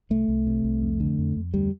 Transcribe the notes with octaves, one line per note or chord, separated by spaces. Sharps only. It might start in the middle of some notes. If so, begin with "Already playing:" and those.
C2 A3
C2
C3
C2
F2
D3
F2
F2
D2 G3